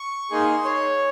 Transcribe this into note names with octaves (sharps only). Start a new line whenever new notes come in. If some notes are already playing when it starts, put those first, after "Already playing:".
Already playing: C#6
A#3 D#4 G#4 C6
C#5